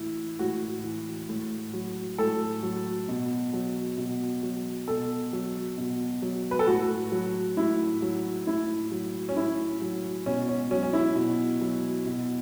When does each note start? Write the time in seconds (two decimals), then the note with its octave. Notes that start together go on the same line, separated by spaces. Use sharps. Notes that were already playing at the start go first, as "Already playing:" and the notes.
Already playing: A2 E3 E4
0.39 A2 F#4
0.84 E3
1.29 A2
1.73 F#3
2.18 A2 A4
2.63 F#3
3.09 B2
3.53 F#3
3.97 B2
4.43 F#3
4.88 B2 A4
5.33 F#3
5.78 B2
6.22 F#3
6.51 B4
6.59 A4
6.67 A2 F#4
7.12 F#3
7.57 A2 E4
8.02 F#3
8.47 A2 E4
8.92 F#3
9.29 C#4
9.37 A2 E4
9.82 F#3
10.26 B2 C#4
10.49 C#4
10.71 F#3 C#4
10.83 C#4
10.93 E4
11.16 B2
11.61 F#3
12.05 B2